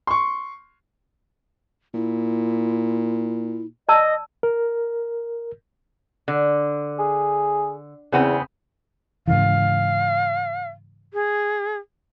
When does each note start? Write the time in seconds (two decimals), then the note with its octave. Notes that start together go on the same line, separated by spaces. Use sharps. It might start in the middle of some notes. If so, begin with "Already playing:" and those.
0.07 C6 C#6
1.94 A#2 E4
3.89 D5 D#5 A5 E6
4.43 A#4
6.28 D3
6.99 G#4
8.12 E2 C#3 B3 C4
9.28 G#2 C#3 E3 F5
11.14 G#4